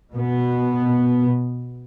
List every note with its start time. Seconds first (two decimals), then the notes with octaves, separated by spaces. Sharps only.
0.13 B2 B3